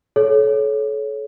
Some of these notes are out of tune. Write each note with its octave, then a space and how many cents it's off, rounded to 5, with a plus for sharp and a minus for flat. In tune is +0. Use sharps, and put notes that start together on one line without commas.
A4 -35 C#5 +0